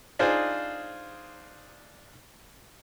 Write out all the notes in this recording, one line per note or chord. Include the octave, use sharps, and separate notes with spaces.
D4 D#4 F4 G#4 C5